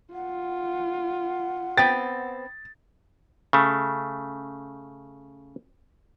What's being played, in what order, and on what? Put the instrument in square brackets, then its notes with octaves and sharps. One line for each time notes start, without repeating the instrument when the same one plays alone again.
[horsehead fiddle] F4 [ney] F#5
[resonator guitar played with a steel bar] B3 C4 G5 [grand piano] A6
[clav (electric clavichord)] C#3 A3